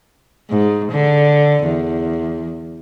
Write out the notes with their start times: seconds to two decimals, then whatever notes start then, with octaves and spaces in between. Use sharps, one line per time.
0.50 G#2
0.92 D3
1.65 E2